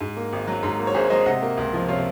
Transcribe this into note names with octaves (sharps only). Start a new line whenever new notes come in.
G#2
A#3
G#1
F#3
G#2
A#3
C#5
G#1 G#4 C5
F#3 C5 D#5
C3 D#5 F#5
A#3
C#2
F3
C3 C#5 F5